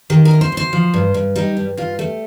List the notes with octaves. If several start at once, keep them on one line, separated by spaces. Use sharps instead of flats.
D#3 G4
A#4
D2
C5
D2
C5
F3
G2
G2
G3 D#4
G2
G2 F4
G3 A3